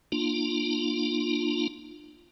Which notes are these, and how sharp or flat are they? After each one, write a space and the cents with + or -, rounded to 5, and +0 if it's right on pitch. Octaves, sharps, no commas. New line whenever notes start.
A#3 +15 D4 +40 F4 +0